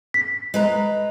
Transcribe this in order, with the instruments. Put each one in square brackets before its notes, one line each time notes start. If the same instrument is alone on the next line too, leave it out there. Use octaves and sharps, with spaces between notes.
[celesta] B6
[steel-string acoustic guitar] G#3 B4 A#5